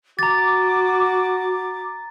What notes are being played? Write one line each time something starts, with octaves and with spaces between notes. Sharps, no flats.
F#4 A#5 D6 A6